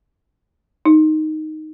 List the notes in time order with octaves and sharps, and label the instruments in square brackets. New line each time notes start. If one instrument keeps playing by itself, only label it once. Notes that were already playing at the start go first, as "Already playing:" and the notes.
[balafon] D#4